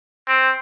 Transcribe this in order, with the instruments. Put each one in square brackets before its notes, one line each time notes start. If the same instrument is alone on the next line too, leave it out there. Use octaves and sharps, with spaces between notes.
[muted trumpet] C4